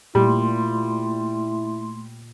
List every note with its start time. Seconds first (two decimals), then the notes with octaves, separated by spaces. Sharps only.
0.15 A#2 G3 A3 E4 C6